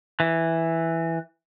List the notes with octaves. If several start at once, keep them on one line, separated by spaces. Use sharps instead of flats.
E3